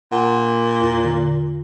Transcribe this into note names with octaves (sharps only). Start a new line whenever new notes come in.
A#2 F#5
E2 F4
D3 F4